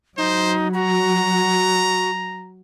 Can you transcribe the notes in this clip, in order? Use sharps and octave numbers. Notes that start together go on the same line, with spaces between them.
F#3 D#4 C5
F#4 A#5